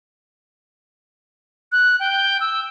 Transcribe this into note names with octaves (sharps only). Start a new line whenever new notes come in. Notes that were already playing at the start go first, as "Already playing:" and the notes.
F#6
G5
E6